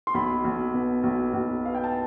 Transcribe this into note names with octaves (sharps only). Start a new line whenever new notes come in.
C6
B1 B5
B1
B2
B1
B1
B3 F5
G5
A5